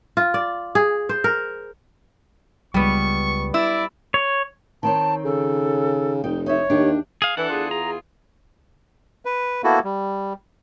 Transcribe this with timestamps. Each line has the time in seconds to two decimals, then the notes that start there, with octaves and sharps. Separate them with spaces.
0.17 F4
0.34 D5
0.75 G#4
1.09 C5
1.24 A#4
2.74 C#2 G3 B3 C#6
3.54 E4 D5 E6
4.14 C#5
4.83 D#3 C4 C#5 A5
5.25 C#3 A4
6.24 F1 D#4 G5
6.46 D#4 C#5 E5
6.70 D#2 D4 G4
7.22 G#4 F5
7.37 E3 D4 A4 F#5
7.49 E2 F4 G#4
7.71 A#5
9.25 B4
9.64 A#3 B3 E4 F#4 A4
9.84 G3